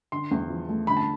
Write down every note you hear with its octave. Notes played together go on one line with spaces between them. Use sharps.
D3 C6
E2
F3
A3
D3 B5
A5